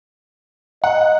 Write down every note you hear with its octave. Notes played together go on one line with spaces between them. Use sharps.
D#5 F#5